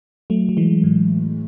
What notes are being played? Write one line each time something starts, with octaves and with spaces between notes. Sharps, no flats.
F#3 A3
F#3
E3 G#3
A2